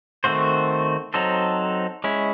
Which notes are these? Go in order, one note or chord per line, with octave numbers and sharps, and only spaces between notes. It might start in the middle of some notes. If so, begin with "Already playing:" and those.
D#3 A3 C4 F#4 C5
F#3 C4 D#4 A4 C5
G#3 C#4 E4